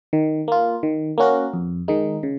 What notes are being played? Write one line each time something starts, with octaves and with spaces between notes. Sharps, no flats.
D#3
A#3 F4
D#3
A#3 C#4 F#4 A#4
F2
D#3 G#3 D#4
C#3